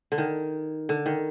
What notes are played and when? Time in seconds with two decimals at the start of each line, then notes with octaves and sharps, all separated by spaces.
0.12 D3
0.18 D#3
0.89 D3
1.06 D#3